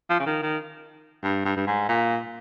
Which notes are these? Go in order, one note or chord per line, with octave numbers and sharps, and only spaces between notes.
F3
C#3
D#3
D#3
G2
G2
G2
G#2
A#2